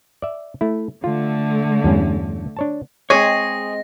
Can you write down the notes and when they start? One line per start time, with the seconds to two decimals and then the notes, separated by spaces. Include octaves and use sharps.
0.22 D5 E5
0.61 A3 E4
1.04 D3 A3 F4
1.84 E2 G2 C#4
2.57 D4 C#5 A5
3.10 G#3 C4 G#4 C#5 A#6